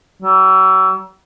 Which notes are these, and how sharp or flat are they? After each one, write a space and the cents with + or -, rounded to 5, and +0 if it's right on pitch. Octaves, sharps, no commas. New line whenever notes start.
F#3 +40